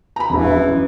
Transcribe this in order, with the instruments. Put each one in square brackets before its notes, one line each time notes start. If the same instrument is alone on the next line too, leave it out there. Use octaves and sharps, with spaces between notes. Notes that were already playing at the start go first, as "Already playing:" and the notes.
[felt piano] A#5 B5
[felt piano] E1 A#1 [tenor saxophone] E3
[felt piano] F#2